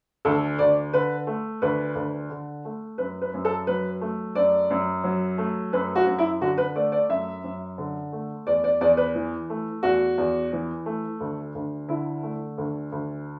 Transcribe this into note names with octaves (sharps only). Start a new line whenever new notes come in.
D2 A4
D2 D5
D3 B4
A3
D2 B4
D2
D3
A3
F#2 B4
B4
F#2
A4
F#3 B4
A3
F#2 D5
F#2
F#3
A3
F#2 B4
F#4
F#2
E4
D3 F#4
B4
A3 D5
D5
F#2 E5
F#2
D3
A3
E2 D5
D5
E2 D5
B4
E3
A3
E2 F#4
E2
E3
A3
D2
D2
D3 E4
A3
D2
D2